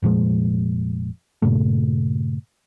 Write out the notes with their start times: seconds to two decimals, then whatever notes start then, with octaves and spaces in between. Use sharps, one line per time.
0.02 F1 A#2 F3 G#3
1.42 G2 A#2 C#3 A3